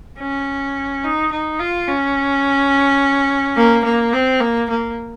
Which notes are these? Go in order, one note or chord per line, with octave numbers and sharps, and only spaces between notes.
C#4
D#4
D#4
F4
C#4
A#3
A#3
C4
A#3
A#3